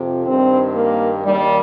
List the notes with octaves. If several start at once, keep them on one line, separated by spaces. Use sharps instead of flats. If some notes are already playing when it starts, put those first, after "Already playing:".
Already playing: F2 C3
G2 D#3 C4
A#3
D#2 D#3 G3